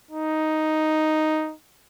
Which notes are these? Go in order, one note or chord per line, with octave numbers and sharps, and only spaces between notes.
D#4